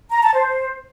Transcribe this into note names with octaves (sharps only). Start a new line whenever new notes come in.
A#5
A5
C5